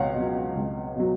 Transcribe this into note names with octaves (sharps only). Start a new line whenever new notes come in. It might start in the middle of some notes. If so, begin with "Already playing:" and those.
Already playing: C#2 B2 C#5 F5 F#5
B2 F#3
C#2
B2 F#3